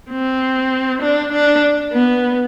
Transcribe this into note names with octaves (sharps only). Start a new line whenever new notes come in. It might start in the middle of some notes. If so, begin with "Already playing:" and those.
C4
D4
D4
B3